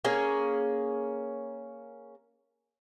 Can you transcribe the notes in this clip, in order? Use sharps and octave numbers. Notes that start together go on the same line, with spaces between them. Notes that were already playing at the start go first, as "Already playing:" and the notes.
A#3 C#4 G#4